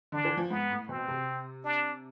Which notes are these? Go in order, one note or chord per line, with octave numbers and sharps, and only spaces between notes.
D3 D4
E3
F3
G#2 B3
A2
B2 C4
C3
D4